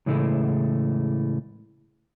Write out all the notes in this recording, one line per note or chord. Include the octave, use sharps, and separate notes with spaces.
A2 C#3 E3 G#3 A3 E4